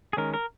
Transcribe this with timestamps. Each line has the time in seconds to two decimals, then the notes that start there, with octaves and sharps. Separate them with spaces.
0.13 G#4
0.17 D#3 G#3 C#4 A#4
0.34 A#4